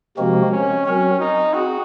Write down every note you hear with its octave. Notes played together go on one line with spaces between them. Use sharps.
C3 F3 G#3 A#3 C4 F#4
C#4
F#3 C4 C#4 F#4 A#4
D#4
C4 F#4 G#4